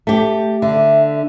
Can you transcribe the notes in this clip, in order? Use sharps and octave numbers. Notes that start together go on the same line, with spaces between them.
A3 G4
D3 E5